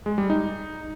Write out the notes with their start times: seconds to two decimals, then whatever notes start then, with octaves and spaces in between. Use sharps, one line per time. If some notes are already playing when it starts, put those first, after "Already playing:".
0.06 G#3
0.18 G3
0.30 D#4